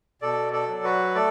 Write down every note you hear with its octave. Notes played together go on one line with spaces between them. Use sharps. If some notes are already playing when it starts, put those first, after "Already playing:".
B2 A4 D5
A4 D5
F#3
F#4 B4
A3 A4 D5